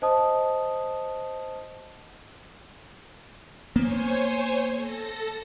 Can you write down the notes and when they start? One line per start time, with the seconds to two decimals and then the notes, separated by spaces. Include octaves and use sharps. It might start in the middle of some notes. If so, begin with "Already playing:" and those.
0.02 C5 D#5 A5 D#6
3.76 A#3 B3 C5 C#5 G#5
4.74 A4 A#6